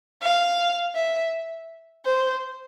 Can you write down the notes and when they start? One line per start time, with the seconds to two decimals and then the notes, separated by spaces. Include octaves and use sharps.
0.22 F5
0.95 E5
2.05 C5